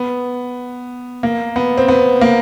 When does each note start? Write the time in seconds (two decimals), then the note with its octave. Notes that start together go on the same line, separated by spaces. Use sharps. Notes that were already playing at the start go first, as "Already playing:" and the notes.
Already playing: B3
1.23 A#3
1.56 B3
1.77 C4
1.88 B3
2.21 A#3